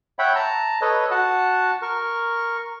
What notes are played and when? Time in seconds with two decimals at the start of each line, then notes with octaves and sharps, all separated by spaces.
0.19 C#5 E5 F#5 G5 B5
0.35 A5 A#5
0.81 A4 B4 C#5 D#5
1.11 F#4 F#5 A5
1.82 A#4 C#6